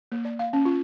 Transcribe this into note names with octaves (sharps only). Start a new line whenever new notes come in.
A#3
D5
F5
C#4
F4